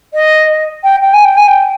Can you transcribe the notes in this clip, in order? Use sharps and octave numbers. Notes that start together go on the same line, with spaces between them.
D#5
G5
G5
G#5
G5
G#5
G5